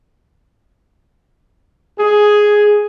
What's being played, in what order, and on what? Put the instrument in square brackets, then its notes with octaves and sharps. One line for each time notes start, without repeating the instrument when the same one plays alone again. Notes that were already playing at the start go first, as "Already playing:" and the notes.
[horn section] G#4